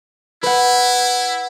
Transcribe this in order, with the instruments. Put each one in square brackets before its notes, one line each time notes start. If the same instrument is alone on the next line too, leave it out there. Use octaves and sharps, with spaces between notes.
[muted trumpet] E4 [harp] B4 F#5